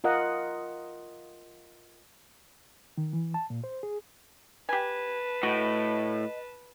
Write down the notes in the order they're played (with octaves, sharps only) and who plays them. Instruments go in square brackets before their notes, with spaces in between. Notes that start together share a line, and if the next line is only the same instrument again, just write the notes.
[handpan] F4 A#4 D#5 F#5
[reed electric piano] D#3
E3
A5
A#2
C5
G#4
[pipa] G4 G#5 [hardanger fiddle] B4 A5
[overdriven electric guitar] A2 [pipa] F#4 [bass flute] D#5